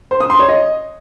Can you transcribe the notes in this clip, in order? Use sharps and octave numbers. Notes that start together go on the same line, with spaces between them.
C5
D#6
C6
C#5
D#5